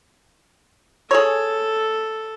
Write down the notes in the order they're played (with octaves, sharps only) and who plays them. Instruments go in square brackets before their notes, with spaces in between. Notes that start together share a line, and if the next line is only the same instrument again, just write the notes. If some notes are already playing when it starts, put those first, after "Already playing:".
[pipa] G#4 C#5 [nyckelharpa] A4